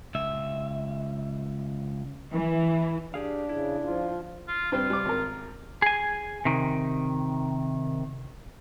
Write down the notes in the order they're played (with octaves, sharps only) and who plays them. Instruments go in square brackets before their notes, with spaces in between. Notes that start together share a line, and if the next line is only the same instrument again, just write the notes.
[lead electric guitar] C#2 E5
[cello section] E3
[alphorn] D4 [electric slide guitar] G4 G#4 F5
[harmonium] C#3 [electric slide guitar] E4
[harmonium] F3 F4
[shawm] F4
[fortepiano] G2 C4 [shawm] F4
[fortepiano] G3 D6
G#1 A#4
[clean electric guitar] G#4 G#5
C3 D#3